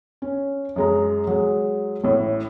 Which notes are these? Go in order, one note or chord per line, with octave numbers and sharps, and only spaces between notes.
C#4
F#2 G#3 A#5
F#3 G#3
A1 A2